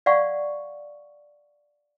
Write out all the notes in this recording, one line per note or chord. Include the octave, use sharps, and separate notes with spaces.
D5 F5 F#5 C#6